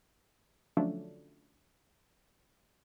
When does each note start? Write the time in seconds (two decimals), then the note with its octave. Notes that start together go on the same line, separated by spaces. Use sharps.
0.77 D3 F3 F#3 A3 C#4 D4